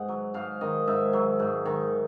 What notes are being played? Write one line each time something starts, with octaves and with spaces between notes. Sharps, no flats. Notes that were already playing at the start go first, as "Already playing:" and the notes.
Already playing: G#2 F#5
F#3
G#2 F5
D#3 D#5
G#2 E5
F#3
G#2
D#3